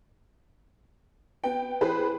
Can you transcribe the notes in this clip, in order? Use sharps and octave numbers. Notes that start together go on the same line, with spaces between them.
B3 G5
E3 G#4 B4 C5